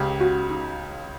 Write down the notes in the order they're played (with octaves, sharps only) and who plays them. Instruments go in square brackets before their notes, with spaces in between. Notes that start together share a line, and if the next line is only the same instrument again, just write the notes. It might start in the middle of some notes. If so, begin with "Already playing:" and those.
Already playing: [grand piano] C#2 C#3 [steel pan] G4
[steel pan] F#4
D#4